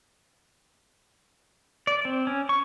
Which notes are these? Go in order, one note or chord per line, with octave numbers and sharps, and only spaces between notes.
D5
C4
C#4
C#6